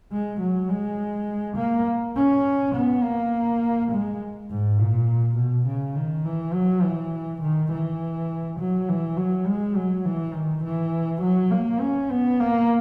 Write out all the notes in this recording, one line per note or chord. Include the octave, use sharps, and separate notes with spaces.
G#3
F#3
G#3
A#3
C#4
B3
A#3
G#3
G#2
A#2
B2
C#3
D#3
E3
F#3
E3
D#3
E3
F#3
E3
F#3
G#3
F#3
E3
D#3
E3
F#3
A#3
C#4
B3
A#3